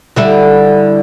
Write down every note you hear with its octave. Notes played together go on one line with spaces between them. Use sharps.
D3 G3 E4